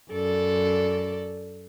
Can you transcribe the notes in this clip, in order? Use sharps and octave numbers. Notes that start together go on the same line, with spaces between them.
F#2 A4 D5